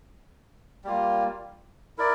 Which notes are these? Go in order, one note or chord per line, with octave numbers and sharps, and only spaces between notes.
G3 A#3 F4
E4 A#4 D5